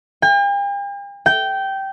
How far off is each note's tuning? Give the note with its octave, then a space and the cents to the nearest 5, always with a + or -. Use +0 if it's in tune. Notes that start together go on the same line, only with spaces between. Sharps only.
G5 +45
G5 -15